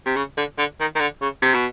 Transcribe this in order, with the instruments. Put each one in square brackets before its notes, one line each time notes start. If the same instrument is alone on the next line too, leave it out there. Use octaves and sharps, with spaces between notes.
[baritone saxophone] C3
C#3
D3
D3
D#3
D#3
D3
C#3
C3
B2